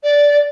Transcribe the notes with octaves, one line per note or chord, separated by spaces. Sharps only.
D5